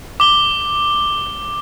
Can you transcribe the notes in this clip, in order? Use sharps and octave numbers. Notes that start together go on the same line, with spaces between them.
D6 G7